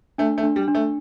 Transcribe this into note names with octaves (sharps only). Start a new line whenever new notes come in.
A3 D4
A3
D4
G3
D4
A3